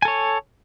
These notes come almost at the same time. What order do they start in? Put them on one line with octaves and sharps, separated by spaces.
G#5 A4 C#5